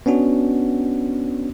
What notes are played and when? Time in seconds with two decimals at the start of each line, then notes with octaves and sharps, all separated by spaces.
0.06 B3 C#4 D4 F#4